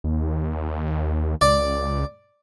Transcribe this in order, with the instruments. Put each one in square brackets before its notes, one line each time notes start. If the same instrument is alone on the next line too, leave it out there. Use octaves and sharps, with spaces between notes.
[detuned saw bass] D#2
[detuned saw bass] C#2 [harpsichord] D5